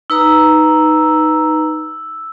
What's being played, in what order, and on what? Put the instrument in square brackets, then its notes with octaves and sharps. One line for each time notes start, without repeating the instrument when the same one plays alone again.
[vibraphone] D#4 B4 A#5 [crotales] E6